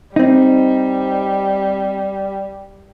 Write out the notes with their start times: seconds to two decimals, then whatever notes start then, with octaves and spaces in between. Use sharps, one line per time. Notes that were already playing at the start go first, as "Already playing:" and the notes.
0.16 G3 C4 D#4